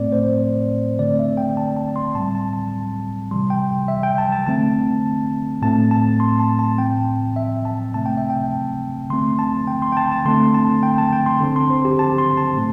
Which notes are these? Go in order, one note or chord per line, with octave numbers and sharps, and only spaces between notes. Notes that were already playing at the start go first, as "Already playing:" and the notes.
Already playing: A2 A3 C4 D5
C5
D3 A3 C4 D5
E5
G5
A5
A5
C6
A2 G3 C4 A5
A5
A5
C3 E3 G3 C6
G5
E5
G5
A5
A5
D3 A3 C4 A5
A2 A3 C4 A5
A5
C6
A5
A5
A2 E3 C4 G5
E5
A5
C3 A3 C4 A5
G5
E5
G5
D3 A3 C4 C6
A5
G5
C6
G5
A5
A5
D3 A3 C4 C6
A5
G5
A5
G5
C6
D3 C4
C6
C5
G4
A5
C6
A5
A2 A3